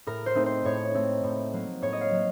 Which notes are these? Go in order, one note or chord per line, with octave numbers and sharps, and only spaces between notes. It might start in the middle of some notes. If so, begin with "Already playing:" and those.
A2 A#4
C5
A3 C4 D#4
C5
A2 C#5
A3 C4 D#4
A2
F#3 A#3
A2 C#5
D#5
F5
F#3 A#3